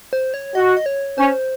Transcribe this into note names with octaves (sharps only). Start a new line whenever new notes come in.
C5
C#5
F#4 D#5
D#5
C#5
C#4 C5